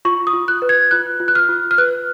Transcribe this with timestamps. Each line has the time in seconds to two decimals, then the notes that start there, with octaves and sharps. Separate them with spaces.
0.05 F4 C#6
0.27 D#6
0.33 F4
0.48 F#6
0.62 B4
0.69 G#6
0.91 F4 F#6
1.20 F4
1.28 F#6
1.35 F6
1.49 F4
1.71 F6
1.78 B4 F#6